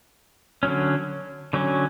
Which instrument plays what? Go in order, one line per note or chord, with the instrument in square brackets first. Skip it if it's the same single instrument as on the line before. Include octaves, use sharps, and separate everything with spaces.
[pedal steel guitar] D3 F#3 C#4
D3 F#3 C#4